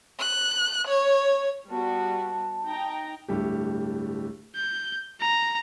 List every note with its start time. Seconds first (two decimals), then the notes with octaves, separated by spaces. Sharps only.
0.19 F#6
0.87 C#5
1.70 G3 B3 F#4 A5
2.66 D#4 G5 A#5
3.29 D1 G2 A3 G4
4.55 G6
5.20 A#5